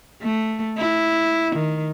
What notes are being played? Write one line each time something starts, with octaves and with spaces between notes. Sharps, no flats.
A3
E4
D#3